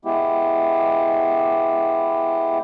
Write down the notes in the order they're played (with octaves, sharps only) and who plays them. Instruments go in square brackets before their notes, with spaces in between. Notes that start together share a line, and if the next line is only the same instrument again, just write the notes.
[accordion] G#3 B3 E4 G4